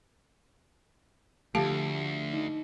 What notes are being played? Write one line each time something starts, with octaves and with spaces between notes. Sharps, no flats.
D2 D3 F3 A3 G4 F5 A5
D#4